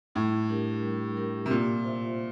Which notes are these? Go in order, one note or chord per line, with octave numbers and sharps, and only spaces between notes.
A2 G3
D4 G4 A#4
G3
D4 G4 A#4
C3
A#2 F4
C5 E5